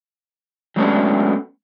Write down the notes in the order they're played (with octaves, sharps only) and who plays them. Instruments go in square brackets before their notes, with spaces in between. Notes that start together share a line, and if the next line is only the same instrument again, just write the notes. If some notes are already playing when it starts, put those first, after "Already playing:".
[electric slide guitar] F#3 G#3 A3 B3 C#4 D4